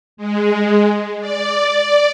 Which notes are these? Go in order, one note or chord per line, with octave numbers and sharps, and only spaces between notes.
G#3
D5